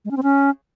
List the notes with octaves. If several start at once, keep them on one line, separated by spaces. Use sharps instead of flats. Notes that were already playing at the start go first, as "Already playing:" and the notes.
G#3
C#4
C4
C#4